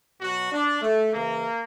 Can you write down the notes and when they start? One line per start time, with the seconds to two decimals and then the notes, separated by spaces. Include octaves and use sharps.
0.21 B2 F#3 F#4
0.52 D4
0.82 A3
1.13 C#3 E3 A#3